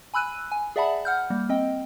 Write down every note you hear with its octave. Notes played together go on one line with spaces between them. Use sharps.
G#5 B5 E6 F#6 D#7
G#5
G#4 D5 E5 F#5 A5 B5
F#5 F6 G6
G3 A#3
C4 D#5 G5